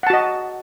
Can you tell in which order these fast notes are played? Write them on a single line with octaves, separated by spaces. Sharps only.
F#5 A5 F#4 D#5